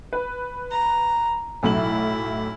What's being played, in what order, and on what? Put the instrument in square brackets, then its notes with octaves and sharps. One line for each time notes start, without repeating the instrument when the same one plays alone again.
[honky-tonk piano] B4
[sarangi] A#5
[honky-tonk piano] B1 A2 F#7 [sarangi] E4